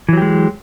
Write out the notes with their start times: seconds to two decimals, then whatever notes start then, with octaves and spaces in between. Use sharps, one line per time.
0.09 E3
0.13 F#3
0.17 G4
0.22 G#3